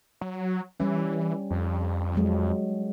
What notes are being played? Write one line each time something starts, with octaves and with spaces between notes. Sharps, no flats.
F#3
E3 G3 C#4
F2
F#3 G#3